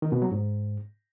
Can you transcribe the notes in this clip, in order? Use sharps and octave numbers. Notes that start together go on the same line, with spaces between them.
D#3
B2
F#3
G#2